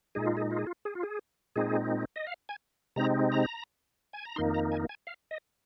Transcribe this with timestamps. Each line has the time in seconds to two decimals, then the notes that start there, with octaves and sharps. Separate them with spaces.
0.15 A#2 G#3 D#4 G#4
0.26 F4
0.37 G#4
0.51 F4
0.59 G#4
0.67 F4
0.85 G#4
0.95 F4
1.03 G#4
1.56 A#2 G#3 C4 D#4 G#4
2.16 D#5
2.27 F5
2.49 G#5
2.96 C3 G#3 C4 D#4 A#5
3.32 A#5
4.13 G#5
4.25 A#5
4.36 F2 D#3 A#3 D#4 C6
4.54 A#5
4.72 G#5
4.89 G#5
5.07 F5
5.31 D#5